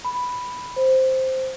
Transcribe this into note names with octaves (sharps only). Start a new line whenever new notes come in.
B5
C5